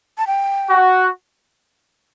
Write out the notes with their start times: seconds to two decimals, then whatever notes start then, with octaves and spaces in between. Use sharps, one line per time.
0.18 A5
0.27 G5
0.69 F#4